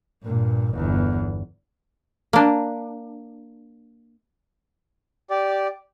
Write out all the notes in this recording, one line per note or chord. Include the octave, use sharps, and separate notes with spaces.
G2 A#2
G1 E2
A#3 D4
G4 D5